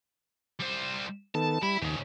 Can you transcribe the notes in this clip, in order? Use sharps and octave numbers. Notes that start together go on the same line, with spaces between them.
G3 C5
D#3 B3 A4 A5
G3 E4 B5
D#2 G#2 C#3